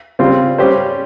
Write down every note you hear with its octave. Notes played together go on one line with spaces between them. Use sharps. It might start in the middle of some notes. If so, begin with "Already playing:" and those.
C#3 G3 C4 F4
G3 C#4 G4 C5